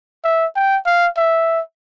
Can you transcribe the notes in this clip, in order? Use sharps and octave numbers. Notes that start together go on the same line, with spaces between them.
E5
G5
F5
E5